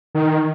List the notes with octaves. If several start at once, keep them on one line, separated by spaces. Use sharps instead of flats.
D#3